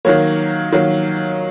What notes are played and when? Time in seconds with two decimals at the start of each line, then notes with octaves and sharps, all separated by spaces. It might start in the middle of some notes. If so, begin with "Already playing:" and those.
0.05 D#3 F#3 A#3 C#5
0.72 D#3 F#3 A#3